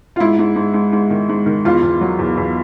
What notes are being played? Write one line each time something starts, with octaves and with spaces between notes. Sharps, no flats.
F4
G#2 E4
G#2
G#2
G#2
G#2
D#3
G#2
D#3
E2 F4
E2
F#3
E2
E2